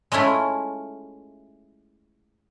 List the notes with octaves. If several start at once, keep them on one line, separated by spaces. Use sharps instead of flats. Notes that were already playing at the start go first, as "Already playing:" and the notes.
G#3 A3 C#4 E4 F4